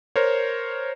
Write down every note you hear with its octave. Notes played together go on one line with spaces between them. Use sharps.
A#4 C5 C#5